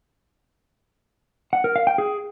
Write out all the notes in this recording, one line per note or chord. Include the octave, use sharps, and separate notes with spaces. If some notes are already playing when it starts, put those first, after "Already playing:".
F#5
A#4
F5
G5
G#4